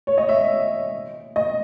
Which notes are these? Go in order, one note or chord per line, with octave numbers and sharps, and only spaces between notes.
C#5
D#5
E5
D#5